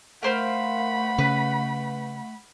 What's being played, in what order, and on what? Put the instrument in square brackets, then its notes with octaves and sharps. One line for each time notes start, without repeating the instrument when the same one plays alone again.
[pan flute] A3 [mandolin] A#4 C5 F5 [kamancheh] F#5 B5
[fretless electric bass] C#3 [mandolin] B4